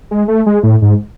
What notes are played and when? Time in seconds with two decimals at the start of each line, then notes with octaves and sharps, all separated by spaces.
0.11 G#3
0.28 A3
0.46 G#3
0.63 A2
0.82 G#2